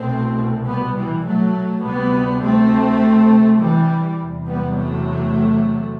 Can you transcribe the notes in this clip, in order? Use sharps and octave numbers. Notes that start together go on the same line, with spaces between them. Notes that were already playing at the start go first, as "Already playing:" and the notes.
Already playing: C2 B2 A3 C4
G3 B3
E3 G3
F#3 A3
D2 C3 G3 B3
A3 C4
E3 G3
E2 C3
G3 B3
F#3 A3